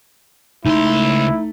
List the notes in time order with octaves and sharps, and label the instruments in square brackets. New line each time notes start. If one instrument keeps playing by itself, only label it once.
[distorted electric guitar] C#2 C6 [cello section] A3 [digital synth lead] D#4 [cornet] E4